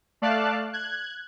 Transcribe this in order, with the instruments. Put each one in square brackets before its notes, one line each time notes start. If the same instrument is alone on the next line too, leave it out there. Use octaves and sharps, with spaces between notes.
[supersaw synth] A3 D5 F5 A5 F#6
F#6 G#6